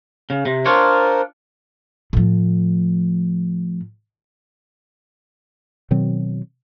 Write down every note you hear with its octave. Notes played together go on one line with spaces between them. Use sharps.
C#3
C3
D4 F4 A#4 C5 C#5
A2 F3
B2 D#3 F#3 C4